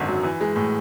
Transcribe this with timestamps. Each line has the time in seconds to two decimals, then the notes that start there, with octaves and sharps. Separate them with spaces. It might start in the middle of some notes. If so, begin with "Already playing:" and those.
Already playing: G#1 F#2 D3
0.08 F#3
0.23 E3
0.41 G#3
0.56 A2